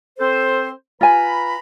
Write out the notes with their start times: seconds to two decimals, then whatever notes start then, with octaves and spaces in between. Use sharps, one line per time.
0.20 C4 A4 C5
1.01 F4 B4 G#5 A#5 B5